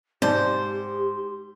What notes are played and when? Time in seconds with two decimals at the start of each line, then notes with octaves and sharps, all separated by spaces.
0.22 G#2 C4 G4 C5 D5 A5